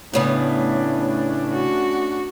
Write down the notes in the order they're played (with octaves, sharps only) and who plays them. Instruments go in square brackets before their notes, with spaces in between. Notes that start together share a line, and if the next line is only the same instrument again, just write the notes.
[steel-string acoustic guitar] A2 C#3 B3 [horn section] A3 C#4 D4
[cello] F#4